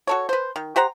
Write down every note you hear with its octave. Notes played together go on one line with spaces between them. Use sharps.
F#4 A4 C#5
B4 C5
D#3
G4 C5 F#5 A#5